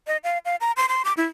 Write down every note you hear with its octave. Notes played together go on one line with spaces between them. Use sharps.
D#5
F5
F5
A#5
C6
C6
D6
E4